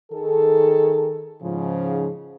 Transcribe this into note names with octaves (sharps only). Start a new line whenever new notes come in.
D#3 G#4 A4
G#2 C#3 F3